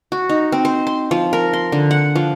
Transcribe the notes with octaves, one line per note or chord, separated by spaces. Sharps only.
F#4
D#4
C4
C5
C6
F3
A#4
C6
D3
F#5
F3